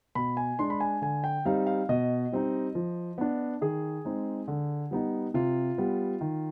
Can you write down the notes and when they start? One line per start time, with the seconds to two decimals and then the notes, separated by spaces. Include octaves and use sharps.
0.15 B2 B5
0.37 G#5
0.59 G#3 D4 C6
0.70 B5
0.80 G#5
1.02 D3 G#5
1.24 G5
1.45 G3 C4 D#4 F5
1.67 F5
1.89 B2 D#5
2.32 G3 C4 D#4
2.75 F3
3.18 B3 D4
3.61 D#3 G#4
4.05 G#3 C4 D#4
4.48 D3
4.91 G3 B3 D#4
5.34 C3 F4
5.78 G3 B3
6.21 D#3